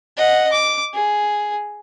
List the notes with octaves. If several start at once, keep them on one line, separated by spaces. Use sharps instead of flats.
D#5 F#5
D6
G#4